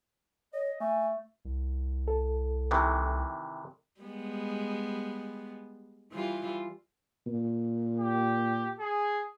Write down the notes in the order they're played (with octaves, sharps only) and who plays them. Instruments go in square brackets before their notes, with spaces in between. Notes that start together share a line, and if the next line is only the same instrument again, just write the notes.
[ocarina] C#5 [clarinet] D#5
[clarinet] A3 [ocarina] G#5
[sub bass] C2
[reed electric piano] A4
[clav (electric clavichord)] C3 D#3 E3
[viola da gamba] G3 G#3 B3
E3 G3 F4
[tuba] A#2
[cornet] G4
G#4